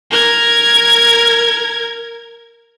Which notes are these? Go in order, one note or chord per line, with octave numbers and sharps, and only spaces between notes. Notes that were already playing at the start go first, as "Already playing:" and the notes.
A#4 G#6